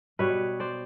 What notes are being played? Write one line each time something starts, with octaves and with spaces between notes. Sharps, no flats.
B2 G3 B4 C#5
C5 D5